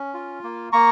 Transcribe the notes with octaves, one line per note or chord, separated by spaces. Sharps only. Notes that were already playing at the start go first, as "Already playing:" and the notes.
Already playing: C#4
F4
A#3
A#3 A#5 C#6